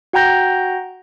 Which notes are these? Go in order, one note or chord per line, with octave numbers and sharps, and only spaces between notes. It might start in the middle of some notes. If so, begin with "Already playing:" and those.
F#4 F#5 G5 A#5 G6 A#6